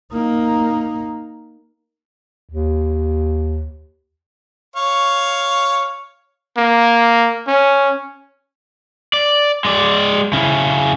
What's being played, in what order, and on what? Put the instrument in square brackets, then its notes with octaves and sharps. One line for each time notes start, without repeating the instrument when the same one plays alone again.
[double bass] A#3 D#4
[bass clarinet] D#2
[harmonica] C#5 F5 C#6
[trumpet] A#3
C#4
[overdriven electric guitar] D5
G#3 D5
C#3 E4